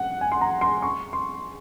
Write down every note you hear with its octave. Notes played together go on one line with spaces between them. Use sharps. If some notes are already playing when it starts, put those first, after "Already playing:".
Already playing: F#5
G#5
C6
A#5
C6
C#6
C6